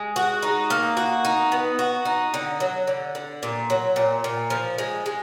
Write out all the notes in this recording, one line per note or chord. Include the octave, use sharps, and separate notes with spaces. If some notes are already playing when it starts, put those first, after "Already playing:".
Already playing: G#3
F#4
D#4
A#3
F#4
D#4
B3
F#4
D#4
D3
F#3
D3
D3
A#2
F#3
A#2
A#2
F3
G#3
G#3